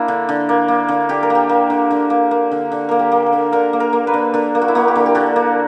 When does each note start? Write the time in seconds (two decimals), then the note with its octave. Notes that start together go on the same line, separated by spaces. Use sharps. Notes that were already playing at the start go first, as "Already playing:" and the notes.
Already playing: A#3 D4 E4
0.08 D3
0.29 D3
0.49 A#3
0.68 A#3
0.89 D3
1.09 D3 G4
1.23 A#4
1.30 A#3
1.35 G4
1.49 A#3
1.70 D3
1.91 D3
2.10 A#3
2.31 A#3
2.51 D3
2.72 D3
2.89 A#3 A#4
2.99 G4
3.12 A#3
3.26 A#4
3.32 D3
3.52 D3 A#4
3.73 A#3
3.80 A#4
3.93 A#3
4.07 B4
4.14 D3
4.34 D3 A#4
4.55 A#3
4.62 F#4
4.68 E4
4.75 A#3 F#4
4.88 G4
4.95 D3
5.06 G4
5.15 D3 F#4
5.36 A#3